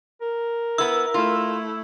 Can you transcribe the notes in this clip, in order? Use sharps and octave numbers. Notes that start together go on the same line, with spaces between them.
A#4
B3 E4 E6
A3 E4 F4